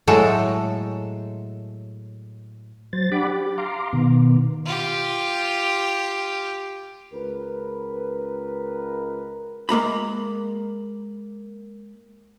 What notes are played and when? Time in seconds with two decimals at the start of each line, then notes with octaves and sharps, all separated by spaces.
0.07 A2 F#3 G#3 A4
2.93 F#3 C5 A6
3.12 D4 G4 F#5 B5 D6
3.27 G4
3.58 F5 A#5 C6 D6
3.93 B2 D#3 B3
4.66 F4 G4
7.13 C#2 A#4 B4
9.69 G#3 A#3 A#5 B5